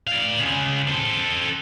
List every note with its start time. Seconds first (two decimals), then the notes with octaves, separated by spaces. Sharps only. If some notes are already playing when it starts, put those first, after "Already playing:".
0.07 D5 F5
0.39 C#3 G#3
0.88 A4 C5